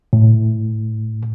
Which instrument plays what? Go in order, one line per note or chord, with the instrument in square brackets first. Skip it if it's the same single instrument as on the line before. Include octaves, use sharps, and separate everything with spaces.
[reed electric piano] A2